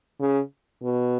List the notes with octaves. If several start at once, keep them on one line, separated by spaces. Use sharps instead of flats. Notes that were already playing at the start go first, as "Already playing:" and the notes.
C#3
B2